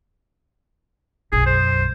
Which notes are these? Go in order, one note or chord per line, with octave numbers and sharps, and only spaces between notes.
B1 F#2 G#4
C5